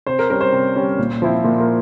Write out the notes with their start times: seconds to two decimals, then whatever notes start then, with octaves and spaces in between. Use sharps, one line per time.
0.06 C3 C5
0.19 A#4
0.30 G3 C#4 A#4
0.41 C5
0.52 C3
0.76 G3 C#4
0.98 A#2
1.22 F3 C4 E4
1.44 A#2 A#4
1.60 A#4